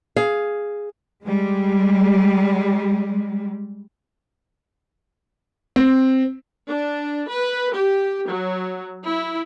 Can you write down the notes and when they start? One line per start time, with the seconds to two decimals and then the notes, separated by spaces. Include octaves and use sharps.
0.16 G#4 F5
1.24 G3 G#3
5.76 C4
6.69 D4
7.29 B4
7.73 G4
8.28 F#3
9.05 E4